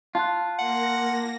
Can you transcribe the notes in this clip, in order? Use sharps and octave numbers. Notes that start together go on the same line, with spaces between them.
F4 A5 C6 F#6
A#3 F#5 A#6